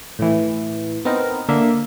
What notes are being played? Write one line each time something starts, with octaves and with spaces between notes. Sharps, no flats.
A2 E3
B3 C4 D#4 A#4
D3 A#3 E5